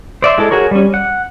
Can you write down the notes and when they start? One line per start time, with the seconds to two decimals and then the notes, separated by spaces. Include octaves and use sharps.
0.22 C5 D5 E5 C6
0.38 G#3 E4 A4
0.51 F#4 G#4 A#4 C#5
0.71 G3 C#4
0.94 F#5